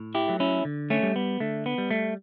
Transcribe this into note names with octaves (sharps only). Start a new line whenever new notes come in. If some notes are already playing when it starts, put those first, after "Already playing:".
Already playing: A2
E4 G4
F#3 A3
C#4 E4
D3
A3 C#4
G3
B3
D3 A3
B3
G3
A3